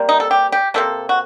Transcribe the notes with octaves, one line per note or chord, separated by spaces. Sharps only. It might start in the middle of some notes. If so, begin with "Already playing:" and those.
Already playing: C3 G3 A#3
D#4
A4
G4
G4
C3 G3 A#3 A4
F#4